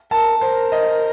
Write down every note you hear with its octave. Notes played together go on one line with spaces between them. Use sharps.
A#4 A5
A#4 C5
D#5